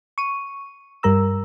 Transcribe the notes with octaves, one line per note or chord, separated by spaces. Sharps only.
C#6 D#7
G2 G3 A#4 A#5 E6